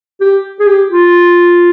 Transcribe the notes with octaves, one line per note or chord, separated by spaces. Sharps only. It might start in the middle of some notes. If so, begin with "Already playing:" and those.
G4
G#4
G4
F4